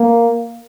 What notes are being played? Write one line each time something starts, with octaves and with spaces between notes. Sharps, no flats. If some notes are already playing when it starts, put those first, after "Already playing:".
Already playing: A#3